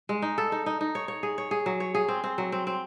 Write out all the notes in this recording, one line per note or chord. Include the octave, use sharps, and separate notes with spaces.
G#3
D#4
A4
D#4
D#4
D#4
C#5
C#5
G#4
C#5
G#4
F#3
C#5
G#4
C4
C4
F#3
C4
C4